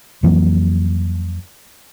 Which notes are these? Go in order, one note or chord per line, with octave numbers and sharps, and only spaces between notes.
F2 E3 F#3 A#3